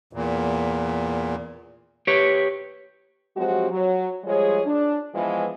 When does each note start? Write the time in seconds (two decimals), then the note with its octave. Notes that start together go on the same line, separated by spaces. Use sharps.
0.13 E2 A#2
2.07 G4 B4 C#5
3.37 F3 F#3 G#3 C4 F#4 G4
3.71 F#3
4.25 F3 G3 G#3 G#4 C#5
4.66 D4
5.15 E3 F3 G#3 B3 F4